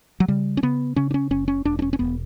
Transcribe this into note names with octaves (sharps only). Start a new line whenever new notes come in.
F#3
C#3 G3
C#4
C#3 B3
C#3 C#4
D4
C#4
F#1 C#4
C#4
E1 D4
D4
C#4
C#4
E1 B3